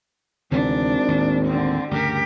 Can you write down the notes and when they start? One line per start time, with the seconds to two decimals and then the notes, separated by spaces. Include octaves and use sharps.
0.51 G#1 D2 C3 E3 D4
1.08 D#2 A2
1.46 D3 C4
1.91 D2 G2 C#3 G4 A#4